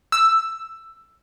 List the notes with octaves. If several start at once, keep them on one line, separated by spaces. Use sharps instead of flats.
E6